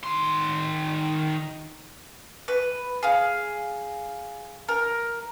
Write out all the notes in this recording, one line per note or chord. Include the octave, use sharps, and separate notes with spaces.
D#3 C6
B4
G#4 F5
A#4